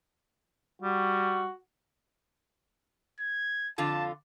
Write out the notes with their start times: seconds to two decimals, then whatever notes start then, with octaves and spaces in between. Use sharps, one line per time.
0.82 G3 F#4
3.20 G#6
3.78 F2 D3 F4 A5